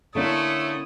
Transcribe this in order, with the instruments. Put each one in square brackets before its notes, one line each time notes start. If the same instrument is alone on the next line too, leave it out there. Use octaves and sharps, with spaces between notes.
[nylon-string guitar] D3 A#3 C#4 [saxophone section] A3 [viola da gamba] E4 C#5 D5 [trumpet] D#6